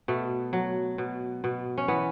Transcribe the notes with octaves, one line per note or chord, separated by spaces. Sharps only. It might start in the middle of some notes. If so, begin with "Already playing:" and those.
B2 A3
F#3
B2
B2
C#4
E3 B3